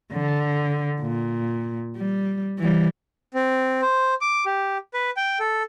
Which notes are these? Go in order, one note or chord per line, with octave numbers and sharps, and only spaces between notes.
D3
A#2
G3
E3 G3
C4
C5
D6
G4
B4
G5
A4